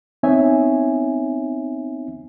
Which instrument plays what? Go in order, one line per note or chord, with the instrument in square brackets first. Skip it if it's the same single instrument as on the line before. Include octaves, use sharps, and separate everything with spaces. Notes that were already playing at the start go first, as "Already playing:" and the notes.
[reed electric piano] B3 C4 D#4 C#5 E5 G#5